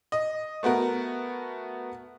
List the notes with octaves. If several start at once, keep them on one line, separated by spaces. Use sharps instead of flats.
D#5
A3 B3 F#4 A#4